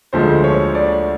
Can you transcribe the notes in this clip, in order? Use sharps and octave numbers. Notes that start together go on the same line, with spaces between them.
D2 D3 F3 G#3 C5
C#5
D5